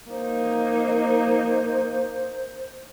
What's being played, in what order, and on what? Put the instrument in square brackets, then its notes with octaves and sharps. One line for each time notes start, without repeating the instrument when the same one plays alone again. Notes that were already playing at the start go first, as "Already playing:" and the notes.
[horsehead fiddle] A#3 D#4 [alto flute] C5